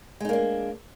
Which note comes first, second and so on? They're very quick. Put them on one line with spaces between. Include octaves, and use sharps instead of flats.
G#3 D#4 A#3 D4